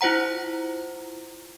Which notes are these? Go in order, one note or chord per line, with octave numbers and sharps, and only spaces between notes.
E4 F4 C5 F#5 A#5